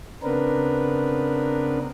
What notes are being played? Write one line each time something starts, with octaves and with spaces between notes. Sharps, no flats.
C#3 B3 C4 D4 A#4 B4